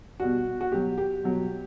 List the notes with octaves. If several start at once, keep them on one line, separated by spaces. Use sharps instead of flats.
B2 G3 F#4
F#4
B2 F#3 G4
G4
B2 F#3